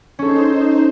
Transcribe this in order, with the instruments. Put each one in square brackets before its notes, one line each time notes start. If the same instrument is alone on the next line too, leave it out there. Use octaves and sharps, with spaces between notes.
[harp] C#4 A4 [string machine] D#4 C5